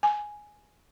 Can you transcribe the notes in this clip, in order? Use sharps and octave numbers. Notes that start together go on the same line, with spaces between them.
G#5